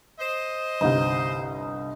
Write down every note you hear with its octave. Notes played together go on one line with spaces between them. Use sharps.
C5 D#5
G1 C2 D#4